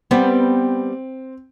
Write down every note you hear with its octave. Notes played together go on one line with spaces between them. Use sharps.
G3 B3 C4